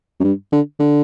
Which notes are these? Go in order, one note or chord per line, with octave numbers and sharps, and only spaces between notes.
F#2
G2
D3
D3